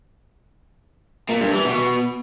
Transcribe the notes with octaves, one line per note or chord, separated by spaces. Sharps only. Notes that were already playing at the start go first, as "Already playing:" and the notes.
A#2
G2
E3
B2